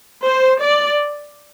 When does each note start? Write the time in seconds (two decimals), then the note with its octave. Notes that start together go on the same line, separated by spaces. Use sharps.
0.26 C5
0.61 D5